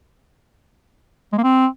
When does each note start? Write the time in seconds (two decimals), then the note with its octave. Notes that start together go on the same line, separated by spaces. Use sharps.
1.32 G#3
1.38 A#3
1.43 C4